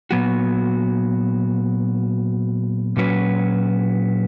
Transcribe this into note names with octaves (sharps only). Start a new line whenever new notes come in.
A#2 F#3 B3 F#4
A#2 F#3 C#4 F#4 B4